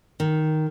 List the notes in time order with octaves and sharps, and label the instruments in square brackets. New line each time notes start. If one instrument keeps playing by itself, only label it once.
[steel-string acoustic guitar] D#3